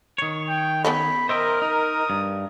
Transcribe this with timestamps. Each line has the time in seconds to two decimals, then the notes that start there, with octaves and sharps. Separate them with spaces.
0.18 D#3 C#5
0.49 G5
0.84 B3 C#4 A4 B5
1.29 A#4 C5 D#5 E5 G5
1.62 D#4 D#6
2.10 G2